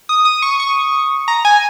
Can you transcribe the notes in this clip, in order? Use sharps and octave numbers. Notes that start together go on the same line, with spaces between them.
D#6
D#6
C#6
C#6
A#5
G#5